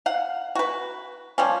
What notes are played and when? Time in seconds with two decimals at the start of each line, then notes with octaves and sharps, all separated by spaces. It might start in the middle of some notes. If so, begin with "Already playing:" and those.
0.06 F5 F#5
0.55 F#4 B4
1.38 F3 G3 C#4